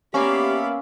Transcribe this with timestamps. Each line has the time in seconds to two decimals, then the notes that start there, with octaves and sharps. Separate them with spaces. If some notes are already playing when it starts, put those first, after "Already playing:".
0.14 A#3 B3 C#4 G4 D5 E5 F5 B5